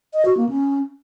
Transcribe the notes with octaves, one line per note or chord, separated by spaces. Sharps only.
D#5
F#4
A#3
C#4